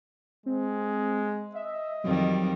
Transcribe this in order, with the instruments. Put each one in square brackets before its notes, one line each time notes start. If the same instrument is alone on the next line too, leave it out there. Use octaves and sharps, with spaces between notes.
[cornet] G#3 [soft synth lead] C4
[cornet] D#5 [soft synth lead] E5
[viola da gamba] F2 D#3 G3 [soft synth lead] F#3